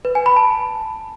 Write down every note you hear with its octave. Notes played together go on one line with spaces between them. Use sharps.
B4
G#5
B5
A5